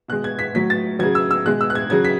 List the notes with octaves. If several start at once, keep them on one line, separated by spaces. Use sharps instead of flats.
B2 G#3 F#6
G#6
B6
A2 F#3 B6
A6
C#3 F#3 G#6
E6
E6
B2 G#3 F#6
E6
F#6
G#6
C#3 F#3 G#6
B6